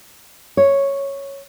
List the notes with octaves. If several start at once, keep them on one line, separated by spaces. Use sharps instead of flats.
C#5